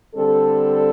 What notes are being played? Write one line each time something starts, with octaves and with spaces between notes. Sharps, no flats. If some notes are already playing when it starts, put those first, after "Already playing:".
D3 G3 C4 A4